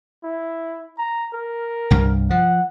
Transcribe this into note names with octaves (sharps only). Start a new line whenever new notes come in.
E4
A#5
A#4
C2 G2
F3 F#5